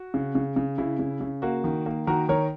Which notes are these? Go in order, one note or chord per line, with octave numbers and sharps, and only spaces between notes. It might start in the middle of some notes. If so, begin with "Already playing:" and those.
Already playing: F#4
C#3
C#3
C#3
C#3 E4
C#3
C#3
A#3 F#4
D#3
A#3
D#3 F#4 A#4
D#3 A#4 C#5